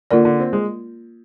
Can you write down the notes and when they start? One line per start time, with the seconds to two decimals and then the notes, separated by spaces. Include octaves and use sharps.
0.11 D3 A#3 F4 A#4 D5
0.25 D3
0.39 C4
0.53 G#3